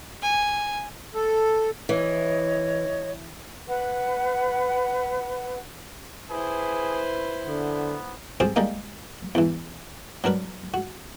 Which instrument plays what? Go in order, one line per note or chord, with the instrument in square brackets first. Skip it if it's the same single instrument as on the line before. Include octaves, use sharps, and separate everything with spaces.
[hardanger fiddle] G#5
[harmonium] A4
[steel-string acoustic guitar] E3 [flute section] C#5 D#5
[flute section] B4 F#5
[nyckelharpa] E4 C5 [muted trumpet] G#4 [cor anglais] B4
[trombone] D3 [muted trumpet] B3
[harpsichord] F3 C4 F4 G4 G#4 C5
G3 G#3 A#3 D#4
E2 E3
F#3 D4 A#4 B4
F#4